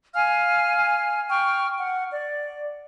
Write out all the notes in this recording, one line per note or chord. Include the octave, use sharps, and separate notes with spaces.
F5 G#5 F6
G5 C#6 F6
F#5
D5